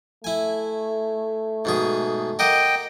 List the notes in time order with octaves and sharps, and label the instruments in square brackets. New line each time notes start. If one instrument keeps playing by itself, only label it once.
[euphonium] A3 [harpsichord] E4 G#5
[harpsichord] G#2 B2 G#4
[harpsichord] G4 A#4 F#5 [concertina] D#5 G5